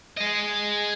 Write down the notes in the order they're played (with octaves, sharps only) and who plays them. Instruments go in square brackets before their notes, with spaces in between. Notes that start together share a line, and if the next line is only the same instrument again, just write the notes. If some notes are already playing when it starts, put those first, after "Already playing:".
[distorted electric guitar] G#4 D#5